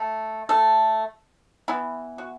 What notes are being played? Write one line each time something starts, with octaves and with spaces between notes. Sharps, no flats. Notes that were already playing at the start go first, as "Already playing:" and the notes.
Already playing: A3
A3 A4
E3 B3 E4
F#4